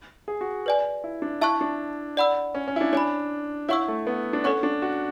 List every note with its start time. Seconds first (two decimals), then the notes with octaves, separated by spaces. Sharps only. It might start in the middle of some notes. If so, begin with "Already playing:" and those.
0.28 G#4
0.41 F#4
0.66 B4 D5 G#5
1.04 E4
1.22 D4
1.41 E4 E5 A5 C#6 F#6
1.61 D4
2.17 D5 F#5 B5 E6
2.55 C#4
2.68 C#4
2.76 E4
2.81 D4
2.93 D4 C#5 G#5 B5
3.69 E4 C#5 F#5 C#6 E6
3.88 A3
4.07 B3
4.33 D4
4.44 C#4 A4 C#5 F#5 C#6 F#6
4.63 D4
4.82 F#4